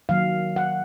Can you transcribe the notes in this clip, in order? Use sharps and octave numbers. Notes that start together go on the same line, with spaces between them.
D#3 F#3 A#3 F5
F#5